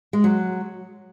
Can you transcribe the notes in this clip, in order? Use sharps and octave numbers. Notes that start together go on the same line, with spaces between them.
G#3
F#3